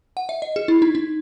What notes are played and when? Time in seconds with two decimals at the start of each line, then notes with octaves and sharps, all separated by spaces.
0.17 F#5
0.29 E5
0.42 D#5
0.56 G#4
0.68 E4
0.82 D#4
0.95 D#4